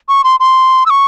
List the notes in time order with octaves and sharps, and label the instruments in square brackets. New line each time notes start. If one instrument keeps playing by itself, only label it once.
[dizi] C#6
C6
C6
E6
C#6